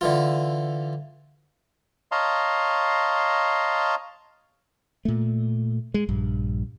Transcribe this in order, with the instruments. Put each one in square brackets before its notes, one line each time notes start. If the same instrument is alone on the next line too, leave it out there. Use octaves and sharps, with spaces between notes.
[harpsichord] D3 E3 F4
[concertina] C#5 D#5 F5 A5 A#5 C6
[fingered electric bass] A#2 A3
G#3
A#1 G2